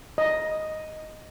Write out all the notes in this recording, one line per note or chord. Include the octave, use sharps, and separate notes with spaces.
D#5